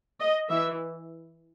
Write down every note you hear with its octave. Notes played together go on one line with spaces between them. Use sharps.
D#5
E3 E5